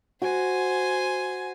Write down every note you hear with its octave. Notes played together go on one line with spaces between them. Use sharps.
F#4 C5 G#5